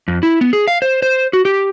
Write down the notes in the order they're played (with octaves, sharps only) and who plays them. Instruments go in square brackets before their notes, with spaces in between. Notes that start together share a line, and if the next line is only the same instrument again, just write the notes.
[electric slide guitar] F2
E4
B3
G#4
F5
C5
C5
F#4
G4